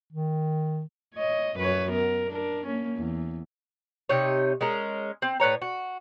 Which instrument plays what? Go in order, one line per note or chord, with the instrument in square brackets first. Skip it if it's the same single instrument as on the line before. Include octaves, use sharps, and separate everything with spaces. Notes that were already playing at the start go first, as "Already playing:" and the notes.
[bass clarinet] D#3
[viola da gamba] C#5 D#5
F#2 B4 C#5
B3 A#4
D4 A#4
A#3 C#4
E2
[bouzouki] C3 D#4 C#5
G#3 C#4 A#4
C4
A2 B4 C#5 A#5
F#4